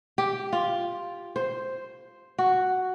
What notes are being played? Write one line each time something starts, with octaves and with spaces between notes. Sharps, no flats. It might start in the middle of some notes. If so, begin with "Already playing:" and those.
G4
F4
C5
F#4